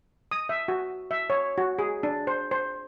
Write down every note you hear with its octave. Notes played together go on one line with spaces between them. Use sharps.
D#6
E5
F#4
E5
C#5
F#4
G#4
D4
C5
C5